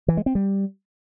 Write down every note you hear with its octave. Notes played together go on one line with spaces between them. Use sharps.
E3
G#3
C4
G3